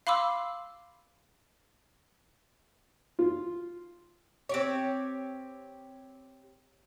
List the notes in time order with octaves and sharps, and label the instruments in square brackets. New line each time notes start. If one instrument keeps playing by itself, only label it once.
[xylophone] F5 B5 C6 D6 E6
[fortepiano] F4
[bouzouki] C4 G4 C#5